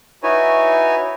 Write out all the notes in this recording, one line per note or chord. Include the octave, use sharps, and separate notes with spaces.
D#4 E4 F#4 B4 C#5 G#5